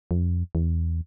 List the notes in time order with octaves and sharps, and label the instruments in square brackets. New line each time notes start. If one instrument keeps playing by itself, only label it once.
[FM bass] F2
E2